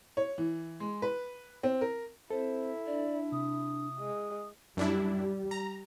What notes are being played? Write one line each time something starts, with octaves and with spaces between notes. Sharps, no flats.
C#5
E3
G#3
B4
C4
A#4
C4 E4 A4 C5
D4 D5
C3 D#6
G#3
F#2 G3 D4 E4
A#5